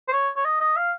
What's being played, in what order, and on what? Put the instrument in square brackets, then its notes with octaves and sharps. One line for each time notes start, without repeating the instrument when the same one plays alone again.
[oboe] C5
C#5
C#5
D#5
D#5
F5